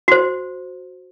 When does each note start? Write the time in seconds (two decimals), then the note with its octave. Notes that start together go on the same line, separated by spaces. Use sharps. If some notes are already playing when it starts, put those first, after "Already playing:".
0.08 F#4 C5